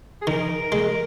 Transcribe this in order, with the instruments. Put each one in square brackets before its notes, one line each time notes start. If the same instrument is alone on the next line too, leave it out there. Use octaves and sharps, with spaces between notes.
[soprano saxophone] G#4
[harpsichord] D#3 [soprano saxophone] A#4
[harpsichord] G#3